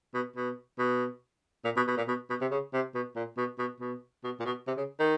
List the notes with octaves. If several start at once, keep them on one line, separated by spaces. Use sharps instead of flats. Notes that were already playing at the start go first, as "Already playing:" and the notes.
B2
B2
B2
A#2
B2
B2
A#2
B2
B2
C3
C#3
C3
B2
A#2
B2
B2
B2
B2
A#2
B2
C3
C#3
D#3